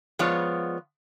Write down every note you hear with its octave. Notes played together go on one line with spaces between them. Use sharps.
F3 G#3 B3 F4 C#5 D5